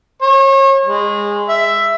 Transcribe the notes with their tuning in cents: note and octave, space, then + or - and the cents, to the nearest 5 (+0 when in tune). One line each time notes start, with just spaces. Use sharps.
C#5 -35
G#3 -20
E5 +10